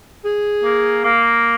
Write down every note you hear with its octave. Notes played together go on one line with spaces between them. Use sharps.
G#4
A#3
A#3